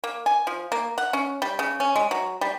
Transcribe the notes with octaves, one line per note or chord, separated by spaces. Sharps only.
A#3
G#5
F3
A#3
F#5
C#4
G3
C#3
C#4
G#3
F#3
G3